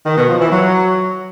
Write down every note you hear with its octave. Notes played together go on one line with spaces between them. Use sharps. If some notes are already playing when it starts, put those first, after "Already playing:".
D#3
B2
F3
E3
F#3